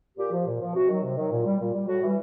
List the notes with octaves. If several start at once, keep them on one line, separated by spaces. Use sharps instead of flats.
A#2 G4
F3
A#2
F3
C3 F#4
D#3 F#3
C3
D#3 F#3
A#2
G3
A#2
G3
A2 F#4
E3 G3